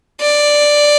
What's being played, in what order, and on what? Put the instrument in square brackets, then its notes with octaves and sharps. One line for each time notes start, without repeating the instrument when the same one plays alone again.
[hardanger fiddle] D5